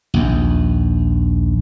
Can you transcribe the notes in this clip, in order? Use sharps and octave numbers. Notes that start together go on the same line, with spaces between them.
A#1 D#2